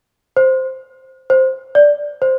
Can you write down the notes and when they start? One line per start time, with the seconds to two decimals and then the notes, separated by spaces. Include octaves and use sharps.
0.37 C5
1.30 C5
1.75 D5
2.22 C5